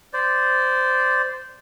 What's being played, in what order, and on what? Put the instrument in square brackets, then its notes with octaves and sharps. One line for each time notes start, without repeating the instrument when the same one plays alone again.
[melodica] C5 D5